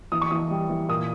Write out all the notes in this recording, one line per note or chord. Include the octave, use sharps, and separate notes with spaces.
E3 D#6
C#6
E3 D#6
G3
E3
A#2 D#6